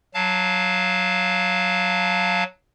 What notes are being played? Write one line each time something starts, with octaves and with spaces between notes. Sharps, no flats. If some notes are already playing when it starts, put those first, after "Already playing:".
F#3 F5 A5